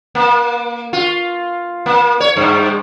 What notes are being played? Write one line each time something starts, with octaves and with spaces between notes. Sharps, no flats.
A#3
F4
A#3
C#5
G2